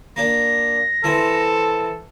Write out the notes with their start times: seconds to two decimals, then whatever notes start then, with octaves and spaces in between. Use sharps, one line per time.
0.16 A#3 D4 A#6
1.04 E3 C4 A4